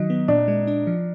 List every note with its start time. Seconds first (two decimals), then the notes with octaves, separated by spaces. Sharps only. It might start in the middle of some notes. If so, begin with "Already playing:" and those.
Already playing: D#3 F#3 D#4
0.10 B3
0.28 A#2 D4
0.48 G#3
0.67 D4
0.87 F3